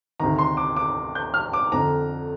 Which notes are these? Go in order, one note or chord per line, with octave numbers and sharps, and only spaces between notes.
D2 C3 D#3 A#5
C6
D6
D6
G6
F6
D6
F2 D3 A#5